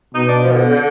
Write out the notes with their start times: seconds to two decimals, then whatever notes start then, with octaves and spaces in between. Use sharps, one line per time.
0.14 B2 D#4
0.28 D4
0.43 F3
0.51 D#3
0.56 D3
0.70 D3